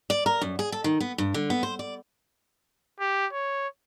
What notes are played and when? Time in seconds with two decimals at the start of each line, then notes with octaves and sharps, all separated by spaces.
0.10 D5
0.26 A#4
0.42 F#2
0.59 G#4
0.72 A4
0.84 D#3
1.00 B3
1.18 G2
1.34 D3
1.50 B3
1.63 C5
1.79 D5
3.00 G4
3.33 C#5